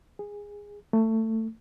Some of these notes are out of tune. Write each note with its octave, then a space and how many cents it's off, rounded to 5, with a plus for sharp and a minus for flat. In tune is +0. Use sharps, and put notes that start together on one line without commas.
G#4 -15
A3 +20